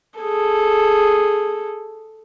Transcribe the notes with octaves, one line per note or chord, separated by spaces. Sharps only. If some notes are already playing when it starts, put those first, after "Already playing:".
G#4 A4